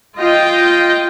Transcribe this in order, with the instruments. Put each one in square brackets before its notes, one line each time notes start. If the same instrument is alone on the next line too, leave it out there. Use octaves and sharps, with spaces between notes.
[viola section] F4 D#5 G5